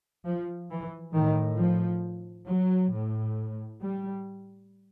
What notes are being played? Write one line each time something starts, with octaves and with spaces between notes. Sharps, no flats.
F3
E3
A2 D#3
F3
F#3
A2
G3